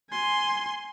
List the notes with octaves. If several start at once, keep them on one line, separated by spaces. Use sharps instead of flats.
G#5 C6